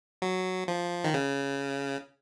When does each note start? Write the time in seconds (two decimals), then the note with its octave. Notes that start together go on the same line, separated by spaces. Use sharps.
0.22 F#3
0.68 F3
1.04 D#3
1.14 C#3